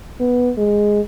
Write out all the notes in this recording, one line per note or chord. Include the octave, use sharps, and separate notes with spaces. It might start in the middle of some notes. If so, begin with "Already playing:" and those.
B3
G#3